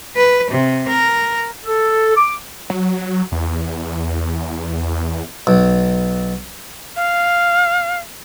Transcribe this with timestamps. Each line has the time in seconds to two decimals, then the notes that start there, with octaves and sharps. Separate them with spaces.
0.16 B4
0.51 C3
0.89 A#4
1.66 A4
2.16 D6
2.70 F#3
3.32 E2
5.47 B1
6.96 F5